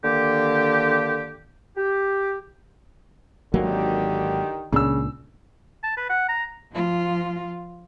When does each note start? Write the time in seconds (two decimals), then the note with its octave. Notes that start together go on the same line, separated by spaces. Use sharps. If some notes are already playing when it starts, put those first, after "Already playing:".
0.04 D3 D#3 A#3 G4
1.77 G4
3.54 G#1 D3 D#3 F#3 A#3 G4
4.73 C#2 A#2 C#3 D4 E6
5.84 A5
5.97 B4
6.09 F#5
6.29 A#5
6.72 F3 F4